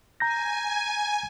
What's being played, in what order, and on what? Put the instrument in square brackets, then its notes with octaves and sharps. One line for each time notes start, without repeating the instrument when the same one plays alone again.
[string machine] G#5 [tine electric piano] A#5 G6 A#6